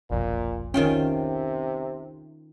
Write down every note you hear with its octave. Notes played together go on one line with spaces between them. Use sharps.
F#1 B1 F2 A#2
C3 D#3 C#4 F4 G5